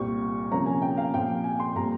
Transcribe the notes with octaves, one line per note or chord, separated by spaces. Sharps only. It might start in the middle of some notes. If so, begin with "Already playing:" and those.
Already playing: C2 A#2 G3 C4 C#6
C3 F3 A#3 C#4 A#5
G#5
G5
F5
A#2 F3 C4 G5
G#5
C6
A#2 G3 C4 A#5